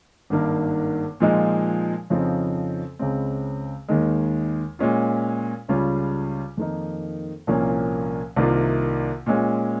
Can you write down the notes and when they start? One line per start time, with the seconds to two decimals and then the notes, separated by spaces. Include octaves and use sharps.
0.30 G#1 G2 D#3 A#3
1.20 A#2 F3 G#3 D#4
2.10 F2 C#3 F3 C4 D#4
2.99 C#2 C#3 G#3 C4
3.88 D#2 D#3 G#3
4.79 A#2 G#3 C#4 F4
5.69 C#2 C#3 G3 C#4 F4
6.57 F2 D#3 A#3 D#4
7.47 C2 A#2 F3 A#3 C#4
8.36 C2 C3 D#3 A#3 F4
9.26 A#2 G#3 C#4 F4